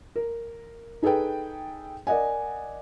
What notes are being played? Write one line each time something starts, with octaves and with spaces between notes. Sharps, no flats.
A#4
D#4 G#4 A4 B4 G5
A#4 D5 D#5 F#5 G#5